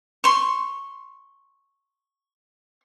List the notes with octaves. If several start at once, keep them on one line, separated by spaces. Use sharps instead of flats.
C6 C#6